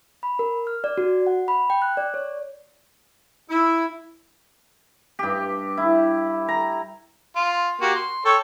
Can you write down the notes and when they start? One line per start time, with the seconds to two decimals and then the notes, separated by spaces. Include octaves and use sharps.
0.23 B5
0.39 A#4
0.67 F6
0.84 D5
0.98 F#4
1.27 F#5
1.48 B5
1.70 G5
1.82 F#6
1.97 D5
2.14 C#5
3.50 E4
5.19 G2 G4
5.77 E4
6.48 A#5
7.36 F4
7.81 A#3 F#4 G4
7.95 C6
8.25 A4 C#5 G5